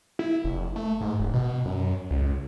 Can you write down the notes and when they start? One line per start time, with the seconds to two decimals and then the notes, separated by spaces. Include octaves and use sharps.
0.19 E4
0.45 F1
0.76 A3
1.01 G#2
1.19 E1
1.34 B2
1.66 F#2
2.11 C#2